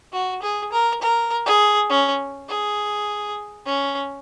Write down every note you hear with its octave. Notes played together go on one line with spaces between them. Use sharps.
F#4
G#4
A#4
A#4
G#4
C#4
G#4
C#4